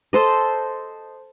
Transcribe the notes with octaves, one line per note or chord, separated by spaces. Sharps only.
A4 C5 D#5